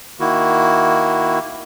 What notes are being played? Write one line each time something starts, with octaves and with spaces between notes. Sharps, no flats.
D#3 A#3 E4 F#4